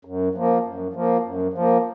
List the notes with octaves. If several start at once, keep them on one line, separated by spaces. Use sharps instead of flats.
F#2
F3 A#3
F#2
F3 A#3
F#2
F3 A#3